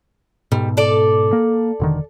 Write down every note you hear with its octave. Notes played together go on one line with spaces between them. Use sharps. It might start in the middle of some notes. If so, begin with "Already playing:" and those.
G#2 B2 G3
A4 D5
A#3
E1 D3 D#3